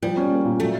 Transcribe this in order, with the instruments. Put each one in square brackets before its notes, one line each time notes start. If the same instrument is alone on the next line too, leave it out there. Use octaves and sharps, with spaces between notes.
[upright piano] F3 [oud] G3
[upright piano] C#4
A#3
A#2
[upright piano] F#3 [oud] A3